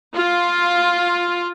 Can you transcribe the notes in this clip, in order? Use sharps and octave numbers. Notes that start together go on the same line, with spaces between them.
F4